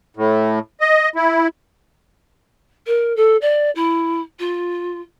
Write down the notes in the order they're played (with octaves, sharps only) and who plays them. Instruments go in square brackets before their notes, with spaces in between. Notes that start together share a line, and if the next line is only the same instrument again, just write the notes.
[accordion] A2
D#5
E4
[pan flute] A#4
A4
D5
E4
F4